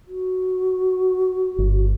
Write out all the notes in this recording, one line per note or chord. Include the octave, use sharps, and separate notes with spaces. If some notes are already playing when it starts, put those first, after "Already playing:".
F#4
G1